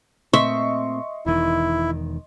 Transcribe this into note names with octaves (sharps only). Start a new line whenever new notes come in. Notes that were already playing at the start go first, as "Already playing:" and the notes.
A#2 A3 C4 D#5 E5 C6 C#6
E1 E2 D#3 E4